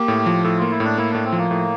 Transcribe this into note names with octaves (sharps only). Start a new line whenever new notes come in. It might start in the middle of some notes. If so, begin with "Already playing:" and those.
Already playing: A#3 G4
A2
F3
A2 A4
A#3 F4
E4
A2 D4
A#3 E4
A2 D4
C4
F3
A#3
A2